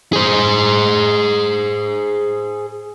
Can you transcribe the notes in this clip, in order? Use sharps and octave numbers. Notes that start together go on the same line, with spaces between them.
G#4 C5